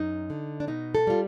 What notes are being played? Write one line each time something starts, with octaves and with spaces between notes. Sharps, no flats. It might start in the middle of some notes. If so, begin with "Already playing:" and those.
Already playing: F#2 D#4
D3
D4
B2 D#4
A4
G3 F4